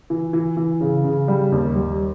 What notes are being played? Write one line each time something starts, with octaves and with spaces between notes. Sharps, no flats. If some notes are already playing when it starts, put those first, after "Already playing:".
E3
E3
E3
C#3
C#3
G3
D#2
G3